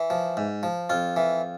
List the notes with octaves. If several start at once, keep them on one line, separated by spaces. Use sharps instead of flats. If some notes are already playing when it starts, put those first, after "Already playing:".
Already playing: E3
F3
G#2
F3
F2 F4
E3